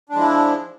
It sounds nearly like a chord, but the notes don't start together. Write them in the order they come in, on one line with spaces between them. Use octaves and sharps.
D4 G#3 F3 E4